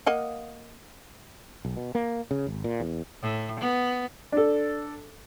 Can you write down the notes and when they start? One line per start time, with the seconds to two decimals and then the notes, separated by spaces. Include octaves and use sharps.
0.06 A#3 D#5 F#5
1.65 B1
1.77 B2
1.95 A#3
2.31 C#3
2.47 G#1
2.64 A#2
2.80 E2
3.22 A2
3.60 B3
4.32 D4 A4